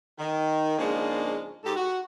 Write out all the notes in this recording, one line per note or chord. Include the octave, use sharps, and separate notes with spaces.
D#3
G#2 C#3 F3 G#3 A#3 D4
G#2 G4 A4
F#4